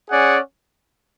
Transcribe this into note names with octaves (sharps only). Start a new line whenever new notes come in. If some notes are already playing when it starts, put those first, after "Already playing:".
C#4 G#4 D5 F#5